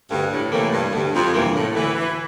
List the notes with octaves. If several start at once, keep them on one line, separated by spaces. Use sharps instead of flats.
D2 G2
A2
A2 C3 E3 A#3
G2
D2 G2
F2
G2 C3 E3 A#3
A2
D2 E3
E3